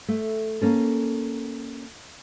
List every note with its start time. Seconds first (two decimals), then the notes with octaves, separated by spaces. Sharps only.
0.08 A3
0.62 A#3 C#4 A4